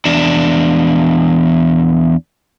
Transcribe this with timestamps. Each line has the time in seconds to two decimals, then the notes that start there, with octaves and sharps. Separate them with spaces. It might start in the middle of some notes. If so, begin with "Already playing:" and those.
0.05 E2 D4